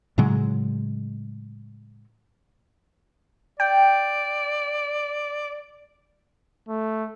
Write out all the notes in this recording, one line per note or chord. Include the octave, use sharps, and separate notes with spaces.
A2 C#3 F#3 G#3
D5 G5
A3